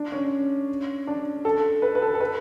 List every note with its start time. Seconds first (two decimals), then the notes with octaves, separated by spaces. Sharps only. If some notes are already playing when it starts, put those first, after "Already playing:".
Already playing: D4
0.12 C#4
1.07 D4
1.45 A4
1.82 B4
1.95 B4
2.02 A4
2.14 A4
2.20 B4